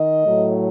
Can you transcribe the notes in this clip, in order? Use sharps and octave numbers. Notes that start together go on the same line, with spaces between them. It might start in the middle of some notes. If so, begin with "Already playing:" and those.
Already playing: D#3 D#5
A2 F#3 A3